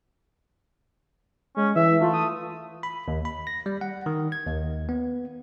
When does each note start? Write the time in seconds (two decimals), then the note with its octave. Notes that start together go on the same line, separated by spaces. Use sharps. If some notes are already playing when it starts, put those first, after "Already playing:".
1.57 G#3 C#4
1.76 E3 E5
2.02 A3 F4
2.13 D#6
2.83 B5
3.08 D#2
3.25 B5
3.47 A#6
3.66 G3
3.81 F#5
4.06 D#3
4.32 G#6
4.47 D#2
4.89 B3